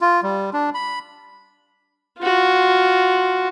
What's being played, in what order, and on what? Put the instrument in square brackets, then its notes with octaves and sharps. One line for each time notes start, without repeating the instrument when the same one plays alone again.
[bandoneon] F4
G3
D4
B5
[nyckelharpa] F4 F#4